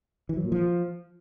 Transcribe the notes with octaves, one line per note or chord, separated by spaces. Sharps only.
E3
F#3
A#2
F3